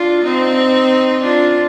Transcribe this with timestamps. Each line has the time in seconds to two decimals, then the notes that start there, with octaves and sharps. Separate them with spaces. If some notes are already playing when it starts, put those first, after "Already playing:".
Already playing: D4 F4
0.25 C4 D#4
1.22 D4 F4